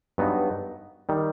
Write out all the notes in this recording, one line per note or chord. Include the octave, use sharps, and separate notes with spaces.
G2 F#3 B3 D#4
D#3 G3